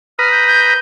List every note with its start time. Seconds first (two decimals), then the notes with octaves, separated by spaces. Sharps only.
0.19 B4 A#5 D#6 F6
0.32 G6
0.47 G6